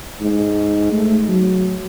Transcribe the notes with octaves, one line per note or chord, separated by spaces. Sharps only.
G#2
A3
F#3